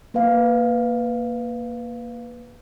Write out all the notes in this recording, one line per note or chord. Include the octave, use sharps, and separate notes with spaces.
A#3 B4 F5